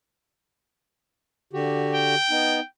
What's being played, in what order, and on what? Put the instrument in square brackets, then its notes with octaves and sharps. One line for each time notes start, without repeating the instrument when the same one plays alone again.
[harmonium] D3 F#4 G4
[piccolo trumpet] G5
[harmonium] B3 D#4